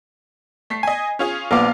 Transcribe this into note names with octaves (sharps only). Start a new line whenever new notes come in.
A3 B6 C7
D#5 G#5
C#4 F4 G#4
A#1 B3 F4 F5 D6